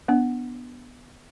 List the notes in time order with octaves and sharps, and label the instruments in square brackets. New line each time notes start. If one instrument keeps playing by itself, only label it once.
[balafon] B3 D4